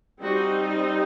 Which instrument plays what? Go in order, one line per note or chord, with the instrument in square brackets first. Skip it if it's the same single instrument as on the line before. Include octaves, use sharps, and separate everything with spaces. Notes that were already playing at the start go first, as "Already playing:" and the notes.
[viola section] G3 C4 D#4 F#4